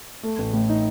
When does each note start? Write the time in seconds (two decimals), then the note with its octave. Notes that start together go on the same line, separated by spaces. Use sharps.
0.23 A3
0.38 A1
0.53 A2
0.69 D#4